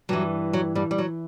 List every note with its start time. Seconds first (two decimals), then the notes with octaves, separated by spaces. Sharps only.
0.09 G2 E3 F#3
0.53 F#3
0.75 G2 G3
0.91 G3
0.98 F#3